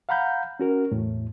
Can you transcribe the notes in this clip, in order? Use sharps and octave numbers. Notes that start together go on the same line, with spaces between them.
F5 F#5 A#5 B5 G6
C#4 F#4 A#4
E2 A2